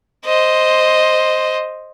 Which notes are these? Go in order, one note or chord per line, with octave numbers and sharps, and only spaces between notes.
C5 D#5